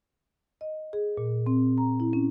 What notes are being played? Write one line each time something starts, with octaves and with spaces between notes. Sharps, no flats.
D#5
G#4
A#2
C4
A#5
E4
C#4